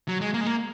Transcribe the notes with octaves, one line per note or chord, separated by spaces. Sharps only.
F#3
G#3
A#3
G#3
A#3